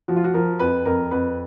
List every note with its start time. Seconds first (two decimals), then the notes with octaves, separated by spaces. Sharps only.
0.08 F3 F#4
0.16 F4
0.24 F#4
0.34 F3 A#4
0.60 F2 B4
0.86 F2 A#4
1.11 F2 B4